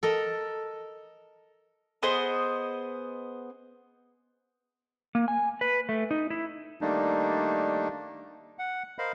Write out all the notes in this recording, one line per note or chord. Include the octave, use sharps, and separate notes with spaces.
A4 A#4 D#5
B3 G#4 C5 D#5
A#3
G#5
B4
A3
D#4
E4
D#3 G3 A3 A#3 D4 D#4
F#5
A#4 C5 D#5 F5 B5